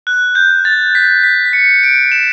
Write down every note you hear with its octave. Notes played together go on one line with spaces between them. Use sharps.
F#6
G6
A6
B6
B6
B6
C#7
D7
E7